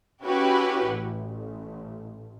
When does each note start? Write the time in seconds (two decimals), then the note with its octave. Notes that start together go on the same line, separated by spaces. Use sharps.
0.23 C#4 E4 F#4 G4 B4
0.88 A1